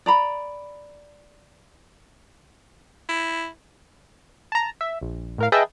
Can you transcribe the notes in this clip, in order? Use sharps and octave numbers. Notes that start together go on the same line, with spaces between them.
D5 A#5 B5
E4
A5 A#5
E5
A#1
A2 A#4 F5
G#4 B4 D#5 E5 G5 A5